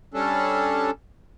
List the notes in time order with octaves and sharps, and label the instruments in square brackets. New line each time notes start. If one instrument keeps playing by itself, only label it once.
[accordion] G3 C#4 D4 A4